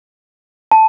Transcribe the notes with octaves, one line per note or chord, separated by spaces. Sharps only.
A5